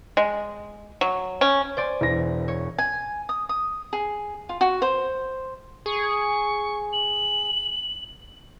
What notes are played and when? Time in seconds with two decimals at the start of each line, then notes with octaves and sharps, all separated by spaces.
0.17 G#3
1.01 F#3
1.41 C#4
1.77 C5 D5 G#5
2.01 E1 E3 A#6
2.48 C#5
2.78 G#5
3.29 D#6
3.49 D#6
3.93 G#4
4.49 F4
4.61 F#4
4.82 C5
5.86 G#4 C#6
6.93 F#7